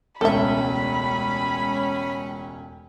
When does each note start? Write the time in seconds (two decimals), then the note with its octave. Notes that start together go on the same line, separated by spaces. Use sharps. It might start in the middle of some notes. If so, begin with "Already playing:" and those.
0.21 E1 C#2 A3 C#4 A4 E5 B5